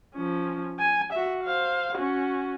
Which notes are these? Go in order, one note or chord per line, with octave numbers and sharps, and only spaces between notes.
F3 C#4
G#5
F#4 E5
C5 F5
C#4 F#4